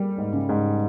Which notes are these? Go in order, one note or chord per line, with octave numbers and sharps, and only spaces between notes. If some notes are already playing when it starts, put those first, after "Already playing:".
Already playing: G3 A#3
G#2
C#3
G#2